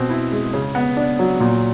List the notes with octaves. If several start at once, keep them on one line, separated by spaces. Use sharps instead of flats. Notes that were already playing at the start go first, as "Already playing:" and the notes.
Already playing: B2 C4
E4
G#3
C#3
B3
D4
F#3
A#2